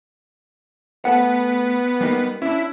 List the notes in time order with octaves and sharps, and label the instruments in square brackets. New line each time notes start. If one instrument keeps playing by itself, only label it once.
[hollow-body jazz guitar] A3 A4 F#5 [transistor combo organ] B3
[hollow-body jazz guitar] G3 A#3 D#4
[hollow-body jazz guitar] C#4 D4 [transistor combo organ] E4